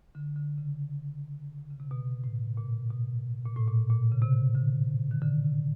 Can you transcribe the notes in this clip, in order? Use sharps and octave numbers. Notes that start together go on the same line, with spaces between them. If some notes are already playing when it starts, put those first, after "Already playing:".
D3
D3
C#3
C#3
C3
B2
A2
A#2
B2
A#2
A2
A#2
A#2
C#3
C3
D3
D#3
D3
C#3